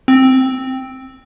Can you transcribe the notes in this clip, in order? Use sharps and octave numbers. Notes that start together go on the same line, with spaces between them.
C4